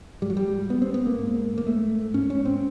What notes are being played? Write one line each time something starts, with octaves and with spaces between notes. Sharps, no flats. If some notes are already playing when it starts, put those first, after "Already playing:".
G#2 G3
F#3
G3
B3
C4
B3
A#3
G#2
A#3
A3
G#2 C#4
C#4
C4